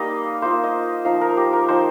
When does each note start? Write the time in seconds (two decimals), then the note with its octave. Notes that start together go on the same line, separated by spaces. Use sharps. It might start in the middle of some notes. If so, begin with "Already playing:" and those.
Already playing: G3 A#3 D#4 D#5 F5
0.42 A#3 F4 C5
0.63 D#5
1.05 F3 D#4 F5
1.21 A#4
1.37 G4
1.53 A#4
1.68 F3 D#4 C5